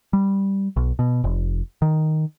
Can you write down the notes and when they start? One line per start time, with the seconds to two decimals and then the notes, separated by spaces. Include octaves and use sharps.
0.13 G3
0.76 B1
0.99 B2
1.24 F1
1.82 D#3